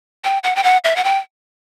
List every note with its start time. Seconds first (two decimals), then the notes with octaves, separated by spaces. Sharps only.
0.24 G5
0.44 F#5
0.56 G5
0.64 F#5
0.84 E5
0.96 F#5
1.04 G5